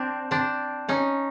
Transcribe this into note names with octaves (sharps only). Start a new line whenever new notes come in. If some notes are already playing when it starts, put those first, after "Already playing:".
Already playing: C4 D4
C4 D4
C#4 D#4